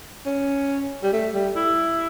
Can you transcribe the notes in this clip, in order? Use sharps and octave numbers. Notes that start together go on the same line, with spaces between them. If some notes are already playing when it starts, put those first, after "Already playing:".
C#4
G3
A3
G3
E4